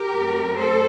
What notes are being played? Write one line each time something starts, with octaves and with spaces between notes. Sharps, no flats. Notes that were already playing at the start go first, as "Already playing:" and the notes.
Already playing: G4 A#4
F#2 F#3 A3 C4
A4 C5